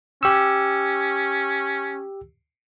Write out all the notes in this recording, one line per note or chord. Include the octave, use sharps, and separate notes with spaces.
C#4 G4 E6